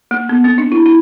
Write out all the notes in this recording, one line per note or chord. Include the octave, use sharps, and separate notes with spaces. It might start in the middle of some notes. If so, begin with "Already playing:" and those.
A#3
B3
C4
D4
E4
E4